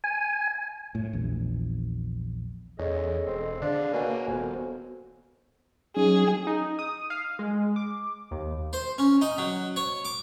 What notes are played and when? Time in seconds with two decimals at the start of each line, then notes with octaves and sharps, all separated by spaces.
0.04 G#5
0.95 A2
1.13 A#1 E2
2.79 E2 C#4 G#4 A4 D#5
3.27 E1 C4
3.62 D3 D4 G#4 F5
3.93 B2 A#3 A#4 C#5 G#5
4.28 D#1 F2 B3 F#4 C5
5.96 F#3 C#4 D#4 G#4
6.47 D#4
6.79 D#6
7.10 F5
7.39 G#3
7.76 D6
8.31 D#2
8.73 C5
8.98 C#4
9.21 D#4
9.38 F#3
9.76 C#5
10.05 D6